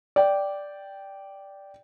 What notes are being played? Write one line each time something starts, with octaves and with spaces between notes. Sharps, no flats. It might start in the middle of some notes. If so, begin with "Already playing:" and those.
D5 G5